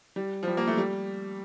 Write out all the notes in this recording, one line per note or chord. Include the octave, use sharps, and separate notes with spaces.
G3
F3
G3
A#3
A3
G3